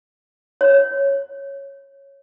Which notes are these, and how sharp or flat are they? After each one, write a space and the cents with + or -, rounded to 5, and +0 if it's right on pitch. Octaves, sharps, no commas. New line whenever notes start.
C#5 -10